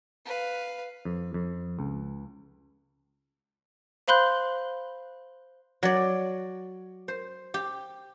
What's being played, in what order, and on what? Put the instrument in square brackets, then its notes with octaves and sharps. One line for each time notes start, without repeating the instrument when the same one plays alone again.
[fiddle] B4 F5
[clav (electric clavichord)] F2
F2
C#2
[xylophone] C5 F5 B5 C6 F#6 G6
[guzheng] F#3 D5
C5
G4